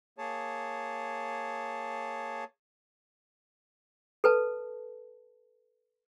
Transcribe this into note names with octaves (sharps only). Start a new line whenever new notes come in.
A#3 G#4 C#5 A5
A4 B4 A5